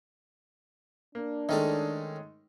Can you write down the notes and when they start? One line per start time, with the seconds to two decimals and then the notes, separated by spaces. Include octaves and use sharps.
1.15 A#3 D4
1.49 D#3 G#3 A3 C#4 D#4 A4